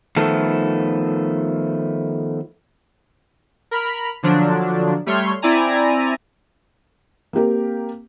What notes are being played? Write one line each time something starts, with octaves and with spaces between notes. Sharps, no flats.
D#3 F3 A3 B3 A4
A#4 B5 F6
D3 F3 F#3 D4
G3 A3 C#5 C6 F6
C4 E4 D5 G#5 A#5
A#3 C4 G4 A#4